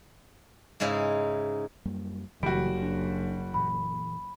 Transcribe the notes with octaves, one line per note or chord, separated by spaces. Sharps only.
G#2 C#3 G#3 D#4 E4
F#2 G3 A#3
F#1 C#3 E3 G3 A3 F#4 D7
D4
A#2 E3 B5